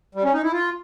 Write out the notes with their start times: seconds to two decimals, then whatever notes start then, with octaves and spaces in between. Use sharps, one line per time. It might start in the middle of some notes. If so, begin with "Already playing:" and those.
0.15 G3
0.24 C#4
0.33 D#4
0.43 E4
0.52 F4